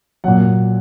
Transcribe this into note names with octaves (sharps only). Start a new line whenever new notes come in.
A#2 F#3 F#5